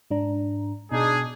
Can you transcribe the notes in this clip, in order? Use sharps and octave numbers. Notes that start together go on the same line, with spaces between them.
G#2 D4 A#5
B2 D4 D#4 G#4